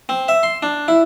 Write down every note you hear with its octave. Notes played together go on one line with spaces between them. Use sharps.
C4
E5
C6
D4
E4